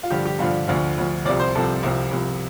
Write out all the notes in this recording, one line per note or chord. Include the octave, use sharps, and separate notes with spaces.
F4
G2 D3 F3 G4
G4
G2 D3 F3 F4
D2 D3 F3 F4
D2 D3 F3
C2 C3 F3 D5
C5
C2 C3 F3 A4
C2 C3 F3
C2 C3 F3